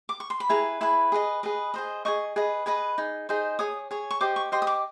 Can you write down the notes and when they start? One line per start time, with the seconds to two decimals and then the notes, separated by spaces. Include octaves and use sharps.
0.09 D6
0.20 C#6
0.30 C6
0.40 B5
0.49 E4 G#4 B4 A#5
0.81 E4 G#4 B4 B5
1.12 G#4 B4 D#5
1.43 G#4 B4 D#5
1.74 G#4 C5 D#5
2.05 G#4 C5 D#5 C#6
2.36 G#4 B4 D#5
2.66 G#4 B4 D#5 B5
2.98 D#4 G#4
3.29 D#4 G#4 C5 D#5
3.59 G#4 C#5 D#6
3.91 G#4 C#5
4.11 C#6
4.21 G4 C5 D#5 D6
4.36 C#6
4.52 G4 C5 D#5 C6
4.62 D#6
4.67 D6